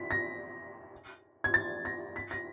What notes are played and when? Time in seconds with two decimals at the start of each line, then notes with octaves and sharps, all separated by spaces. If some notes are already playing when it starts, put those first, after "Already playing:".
Already playing: B6
0.11 A#6
1.44 G#6
1.54 A6
1.85 A#6
2.16 B6
2.31 A#6